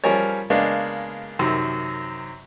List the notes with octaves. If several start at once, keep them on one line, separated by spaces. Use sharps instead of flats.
F3 G3 C#4 G#4 A#4 C#5
C#3 G#3 A#3 B3 D4
F#2 C3 D#3